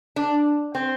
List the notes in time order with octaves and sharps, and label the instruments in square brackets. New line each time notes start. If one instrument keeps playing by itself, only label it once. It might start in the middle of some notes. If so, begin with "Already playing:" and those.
[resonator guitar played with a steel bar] D4
C4